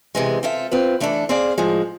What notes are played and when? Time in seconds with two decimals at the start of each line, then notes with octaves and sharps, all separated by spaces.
0.15 C3 E3 G#3
0.43 C4 F4 A4 E5
0.71 C4 F4 B4
1.00 E3 A3 D4 A4
1.29 C4 G#4 D5 F5
1.58 A2 F3 G#3